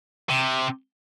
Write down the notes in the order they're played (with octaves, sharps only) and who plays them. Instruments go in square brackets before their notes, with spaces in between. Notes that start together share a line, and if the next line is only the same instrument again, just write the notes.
[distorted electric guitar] C3